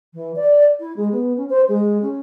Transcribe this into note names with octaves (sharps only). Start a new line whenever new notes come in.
E3
D5
E4
G#3
B3
C#4
C5
G#3
C#4